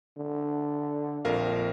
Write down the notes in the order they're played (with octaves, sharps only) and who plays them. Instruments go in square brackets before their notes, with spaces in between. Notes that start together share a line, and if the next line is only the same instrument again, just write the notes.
[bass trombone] D3
[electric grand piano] A#1 A#4 F5 [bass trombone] F2